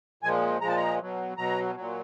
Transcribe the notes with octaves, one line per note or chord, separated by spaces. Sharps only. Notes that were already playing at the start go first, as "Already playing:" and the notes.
A#2 F3 G#3 G#5
A#2 F3 G#3 A#5
A5
A#5
B2 F#3
B2 F#3 A#5
A#2 F#3